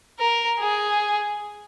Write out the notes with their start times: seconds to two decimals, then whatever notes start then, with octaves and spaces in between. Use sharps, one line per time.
0.19 A#4
0.59 G#4